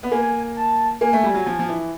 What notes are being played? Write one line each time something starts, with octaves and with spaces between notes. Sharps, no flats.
B3
A#3 G#5
A5
A#3 G#5
A3
G3
F#3
F3
F3
E3